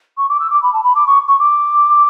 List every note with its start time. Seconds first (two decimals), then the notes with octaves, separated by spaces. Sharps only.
0.18 C#6
0.29 D6
0.40 E6
0.50 D6
0.62 B5
0.73 A5
0.84 B5
0.95 D6
1.07 C#6
1.28 C#6
1.39 D6